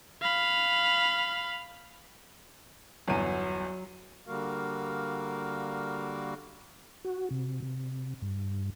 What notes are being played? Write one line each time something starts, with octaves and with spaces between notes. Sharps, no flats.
F5 B5
G1 E2 F#3 F#4 D#7
D3 G3 A#3 F#4 A#4 F5
F#4
C3
C3
G2